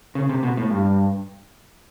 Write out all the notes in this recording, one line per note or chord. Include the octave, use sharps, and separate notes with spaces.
C#3
C3
B2
A2
G2